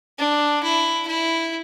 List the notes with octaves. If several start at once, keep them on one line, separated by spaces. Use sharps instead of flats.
D4
E4
E4